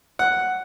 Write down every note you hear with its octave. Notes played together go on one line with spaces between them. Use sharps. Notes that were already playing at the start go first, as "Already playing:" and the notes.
F#5